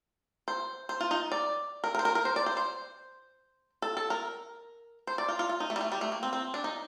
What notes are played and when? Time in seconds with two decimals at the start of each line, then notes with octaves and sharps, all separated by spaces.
0.48 C5
0.89 C5
1.01 F4
1.11 D#4
1.32 D5
1.84 A#4
1.95 A#4
1.99 C5
2.05 A#4
2.15 A#4
2.25 C5
2.36 D5
2.46 C5
2.57 C5
3.82 A4
3.97 A4
4.10 A#4
5.07 C5
5.18 D5
5.28 F4
5.39 F4
5.49 F4
5.60 D#4
5.70 A3
5.76 G3
5.81 A3
5.92 G3
6.01 A3
6.12 A#3
6.23 C4
6.33 C4
6.54 D4
6.64 D#4